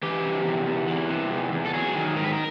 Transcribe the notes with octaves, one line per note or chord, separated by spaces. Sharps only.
E3 G4
C3
E2
E2
E3
C3
E2
E2
A4
F#3 G#4
D#3
G#2 A#4
B4
A#4